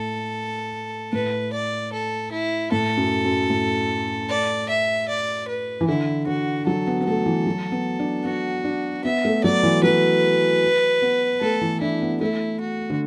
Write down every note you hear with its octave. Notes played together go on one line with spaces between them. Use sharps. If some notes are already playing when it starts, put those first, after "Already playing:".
Already playing: A2 A4
A2 B4
D5
A4
E4
A2 A4
F#2
F#2
A2
D5
E5
D5
B4
E3
D3 E4
D3 F#4
F#3 A4
B3
B3
A3 A4
E3
F#3
B3
D4
B3 F#4
D4
B3 E5
A3
F#3 D5
E3
F#3 B4
B3
A3 A4
E3
D4 E4
B3
A3 E4
F#4
D3